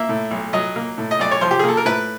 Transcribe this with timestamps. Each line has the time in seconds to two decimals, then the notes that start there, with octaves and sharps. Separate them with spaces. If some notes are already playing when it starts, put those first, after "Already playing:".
Already playing: A#3 E5
0.09 A2
0.31 B1
0.53 F#3 D#5
0.76 A#3
0.98 A2
1.11 D#5
1.19 B1 D5
1.31 C#5
1.41 F3 C5
1.51 G4
1.59 G#4
1.64 A#3 A4
1.77 A#4
1.85 A2 B4